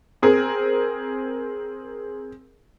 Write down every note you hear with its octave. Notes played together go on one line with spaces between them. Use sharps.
C4 G#4 A#4